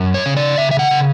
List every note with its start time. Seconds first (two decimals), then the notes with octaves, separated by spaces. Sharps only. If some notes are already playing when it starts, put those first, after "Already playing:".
Already playing: F#2
0.14 C#5
0.26 C#3
0.37 D5
0.58 C#3 E5
0.71 E5
0.79 F#5
0.91 C#3